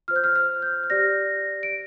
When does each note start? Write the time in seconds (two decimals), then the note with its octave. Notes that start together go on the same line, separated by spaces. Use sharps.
0.08 F4 C5 F6
0.16 G6
0.24 F6
0.35 F6
0.62 G6
0.84 G6
0.90 G4 D5 A#6
1.63 D7